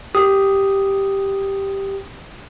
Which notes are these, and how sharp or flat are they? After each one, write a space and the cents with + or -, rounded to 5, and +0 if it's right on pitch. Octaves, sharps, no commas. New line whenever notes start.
G4 +0 D#6 +0